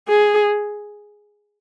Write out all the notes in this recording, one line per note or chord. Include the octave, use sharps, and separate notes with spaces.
G#4